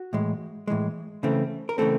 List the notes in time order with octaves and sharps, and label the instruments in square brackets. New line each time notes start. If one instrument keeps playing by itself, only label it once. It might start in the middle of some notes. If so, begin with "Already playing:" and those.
Already playing: [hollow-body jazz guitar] F#4
A2 E3 G#3
A2 E3 G#3
C#3 E3 A3 C4
A#4
C#3 E3 A3 C4 A4